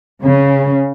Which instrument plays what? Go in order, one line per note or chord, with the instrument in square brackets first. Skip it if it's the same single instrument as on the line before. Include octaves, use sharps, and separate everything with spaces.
[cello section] C#3